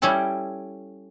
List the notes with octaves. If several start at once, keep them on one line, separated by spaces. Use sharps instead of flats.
G3 C#4 E4 A4 A5